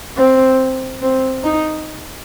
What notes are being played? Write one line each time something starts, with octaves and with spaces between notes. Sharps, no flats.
C4
C4
D#4